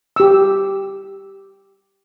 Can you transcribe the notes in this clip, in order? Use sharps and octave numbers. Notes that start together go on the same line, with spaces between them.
G4 E6